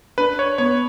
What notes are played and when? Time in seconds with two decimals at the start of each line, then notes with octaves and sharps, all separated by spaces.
0.18 D4 B4
0.39 C#5
0.58 B3 C#5